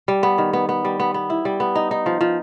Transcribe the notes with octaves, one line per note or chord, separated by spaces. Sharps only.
G3
B3
D#3
B3
B3
G3
B3
B3
E4
G3
B3
D#4
D#4
F3
F3